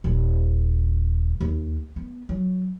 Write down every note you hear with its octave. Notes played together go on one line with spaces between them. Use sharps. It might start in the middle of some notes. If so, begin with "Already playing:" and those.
D#1
D#2
B3
F#3